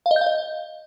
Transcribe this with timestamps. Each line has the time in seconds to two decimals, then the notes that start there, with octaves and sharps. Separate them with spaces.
0.06 F5
0.11 D#5
0.16 G6
0.21 F5
0.26 D#5